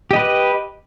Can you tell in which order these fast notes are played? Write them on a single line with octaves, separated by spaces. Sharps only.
G4 D#5 B4